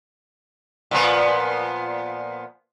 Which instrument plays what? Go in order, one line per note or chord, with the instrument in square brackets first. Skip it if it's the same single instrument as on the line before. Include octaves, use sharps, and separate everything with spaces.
[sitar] A#2 F3 B3